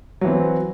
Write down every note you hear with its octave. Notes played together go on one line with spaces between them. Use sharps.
E3 F#3 C4